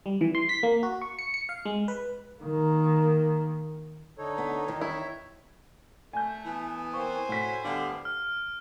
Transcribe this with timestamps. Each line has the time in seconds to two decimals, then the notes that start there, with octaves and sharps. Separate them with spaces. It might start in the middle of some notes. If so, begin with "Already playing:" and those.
0.06 G3
0.21 E3
0.35 C6
0.49 B6
0.63 A#3
0.83 F#4
1.02 C#6
1.19 C#7
1.34 C#7
1.49 F5
1.65 G#3
1.88 B4
2.41 D#3 A#3
4.18 D3 D#4 A4 C#5
4.38 B3
4.68 E2 D#3
4.81 E4 C#5 E5
6.13 A3 G#5 G6
6.46 E3 B3
6.94 A#3 C4 C5 G#5 C#6
7.29 A2 F#4 C#5 B6
7.65 D3 G3 B3 D4 G4 F5
8.05 F6